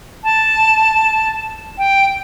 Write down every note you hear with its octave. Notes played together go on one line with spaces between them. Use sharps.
A5
G5